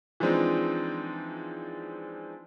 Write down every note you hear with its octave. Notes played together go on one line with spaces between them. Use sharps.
E3 F3 G#3 C4 D4 D#4